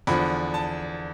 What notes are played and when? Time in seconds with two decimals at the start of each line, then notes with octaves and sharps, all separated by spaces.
0.07 E2 D3 F3 B5
0.54 A5